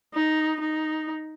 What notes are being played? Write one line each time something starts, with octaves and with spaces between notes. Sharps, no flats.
D#4
D#4